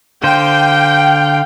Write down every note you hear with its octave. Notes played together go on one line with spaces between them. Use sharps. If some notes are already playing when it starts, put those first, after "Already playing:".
D3 C5 F5 G5